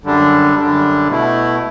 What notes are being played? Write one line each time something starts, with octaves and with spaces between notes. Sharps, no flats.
F#2 D3 G3 D4
F#2 D3 G3 D4
B2 A3 E4